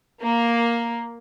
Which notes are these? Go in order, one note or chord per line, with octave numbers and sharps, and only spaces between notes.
A#3